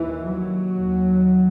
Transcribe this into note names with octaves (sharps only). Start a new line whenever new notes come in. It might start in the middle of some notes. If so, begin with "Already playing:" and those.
Already playing: D#2 E3
F#3
D#2